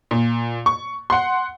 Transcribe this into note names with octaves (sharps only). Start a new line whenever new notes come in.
A#2
C#6
F#5 C6